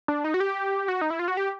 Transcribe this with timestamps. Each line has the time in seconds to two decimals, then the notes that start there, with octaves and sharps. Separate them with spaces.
0.08 D4
0.24 D#4
0.34 F#4
0.40 G4
0.88 F#4
1.01 D#4
1.10 E4
1.19 F4
1.28 F#4
1.37 G4